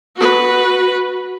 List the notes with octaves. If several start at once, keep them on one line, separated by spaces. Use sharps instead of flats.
F#4 B4